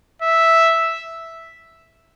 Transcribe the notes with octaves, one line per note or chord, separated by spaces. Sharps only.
E5